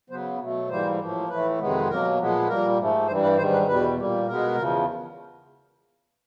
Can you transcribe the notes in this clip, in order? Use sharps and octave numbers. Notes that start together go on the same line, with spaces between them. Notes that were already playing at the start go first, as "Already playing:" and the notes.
C#3 F#3 B3 C5
B2 F#3 A3
G#2 E3 G3 A#3 C5
A2 F3 A#3
A2 E3 A3 B4
F2 C3 D#3 G#3 B3
B2 F#3 A#3 A#4
A#2 F3 G#3 B3
A#2 G3 A#3 A#4
G#2 F3 A3
G2 E3 G3 C5
B4
G#2 D#3 G3 C5
B4
E2 B2 G3 B4
A#2 G3 A#3
B2 G#3 B3 A#4
E2 C#3 F3